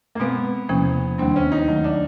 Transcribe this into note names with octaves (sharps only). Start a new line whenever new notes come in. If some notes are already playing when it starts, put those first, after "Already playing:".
A#3
B2 G#3 B3 C4
E2 C3 F3 A#3 C#4
D#2 D#3 G3 A#3 C4 D4
C#4
D#4
D#3 F#3 A3 D#4
D4